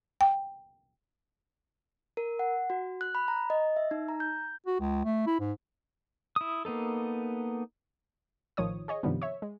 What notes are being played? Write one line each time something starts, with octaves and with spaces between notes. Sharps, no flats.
G5
A#4
F#5
F#4
F#6
B5
A#5
D#5
E5
D#4
A#5
G6
F#4
C#2
A3
E4
G#2
E4 D#6
A#3 B3 D#4 A4
A1 D#3 F3 C#5 D#6
G#4 C#5 D#5
G2 C3 D#3 F3 G3 B3
C#5 E5
G#3